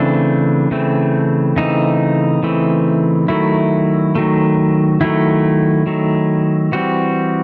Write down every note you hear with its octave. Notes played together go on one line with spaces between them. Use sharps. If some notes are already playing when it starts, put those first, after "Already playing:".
Already playing: C#3 E3 A3 C4 D4
C#3 E3 A3 C4
C#3 E3 A3 C4 D#4
C#3 E3 A3 C4
D#3 F#3 A3 E4
D#3 F#3 A3
D#3 F#3 A3 E4
D#3 F#3 A3
E3 G3 C4 F#4